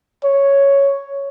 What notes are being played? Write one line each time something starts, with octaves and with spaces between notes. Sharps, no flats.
C#5